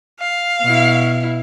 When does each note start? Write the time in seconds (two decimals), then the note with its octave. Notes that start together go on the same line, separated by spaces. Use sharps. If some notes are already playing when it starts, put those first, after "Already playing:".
0.20 F5
0.62 B2 E4